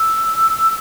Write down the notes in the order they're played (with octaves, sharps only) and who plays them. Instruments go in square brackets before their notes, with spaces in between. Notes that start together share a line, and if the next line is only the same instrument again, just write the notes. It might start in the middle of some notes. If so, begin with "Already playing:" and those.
Already playing: [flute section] E6